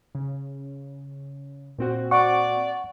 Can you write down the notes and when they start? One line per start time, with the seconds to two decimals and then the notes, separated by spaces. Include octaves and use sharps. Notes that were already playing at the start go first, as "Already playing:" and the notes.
0.15 C#3
1.78 A#2 C4 F#4
2.11 D5 F#5 C#6